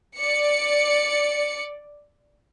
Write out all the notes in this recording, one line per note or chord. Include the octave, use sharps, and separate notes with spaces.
D5 C#7